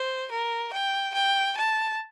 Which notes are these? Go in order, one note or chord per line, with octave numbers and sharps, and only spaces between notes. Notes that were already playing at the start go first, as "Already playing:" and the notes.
Already playing: C5
A#4
G5
G5
A5